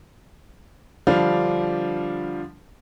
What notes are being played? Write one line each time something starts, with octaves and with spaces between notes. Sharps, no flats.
D3 F3 G3 D4 F5